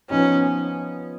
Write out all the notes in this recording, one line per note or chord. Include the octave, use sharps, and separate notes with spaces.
F3 B3 C#4 D#4